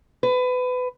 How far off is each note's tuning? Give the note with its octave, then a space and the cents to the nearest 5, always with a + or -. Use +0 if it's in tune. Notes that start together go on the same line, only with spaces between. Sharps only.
B4 +25